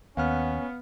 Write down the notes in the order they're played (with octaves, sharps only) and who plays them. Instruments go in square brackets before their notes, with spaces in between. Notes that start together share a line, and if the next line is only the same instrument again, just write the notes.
[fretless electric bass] D#2 [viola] B3 [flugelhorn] C#4 [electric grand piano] F5 F#5 F6